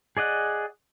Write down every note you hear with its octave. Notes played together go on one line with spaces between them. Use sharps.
G#4 D5 D#5 F#5